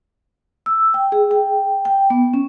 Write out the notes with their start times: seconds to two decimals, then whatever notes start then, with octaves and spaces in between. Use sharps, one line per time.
0.66 E6
0.94 G5
1.12 G#4
1.31 G5
1.85 G5
2.10 B3
2.34 C#4